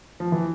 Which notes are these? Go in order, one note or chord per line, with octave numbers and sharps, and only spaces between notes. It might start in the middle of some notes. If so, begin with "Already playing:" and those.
F3
E3